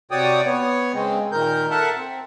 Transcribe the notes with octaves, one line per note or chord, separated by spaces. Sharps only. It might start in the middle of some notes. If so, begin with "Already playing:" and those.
C3 F#4 C#5 D5 G5 D#6
B3 C#5
C#3 G#3 C4
A#2 D#3 A#4 G6
A4 A#4 E5 F#5 A5
C4